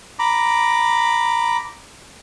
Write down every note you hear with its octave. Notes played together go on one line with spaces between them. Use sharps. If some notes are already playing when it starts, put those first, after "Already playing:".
A#5 B5 D6